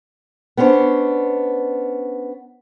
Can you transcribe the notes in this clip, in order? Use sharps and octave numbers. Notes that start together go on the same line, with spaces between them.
B3 C#4 D4 C5